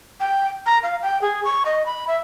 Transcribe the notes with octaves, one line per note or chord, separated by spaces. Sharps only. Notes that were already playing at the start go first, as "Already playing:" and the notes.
G5
A#5
F5
G5
G#4
C#6
D#5
B5
E5